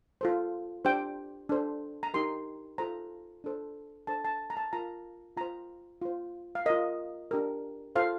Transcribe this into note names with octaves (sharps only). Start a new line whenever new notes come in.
F4 A4 C5
D4 G4 C5 G5
D4 A4 C5
A#5
D#4 G4 A#4 C6
F4 A4 C5 A#5
D4 A4 C5
D4 A4 C5 A5
A5
A#5
A5
F4 A#4 A#5
F4 C5 A#5
F4 C5
F5
F4 A#4 D#5
D4 G4 A#4
F4 A4 C5 F5